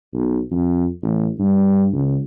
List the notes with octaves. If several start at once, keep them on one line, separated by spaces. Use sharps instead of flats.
B1
F2
A1
G2
C#2